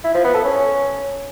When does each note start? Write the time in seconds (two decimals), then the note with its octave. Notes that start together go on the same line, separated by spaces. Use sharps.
0.04 E4
0.14 F3
0.24 B3
0.34 A4
0.44 C#4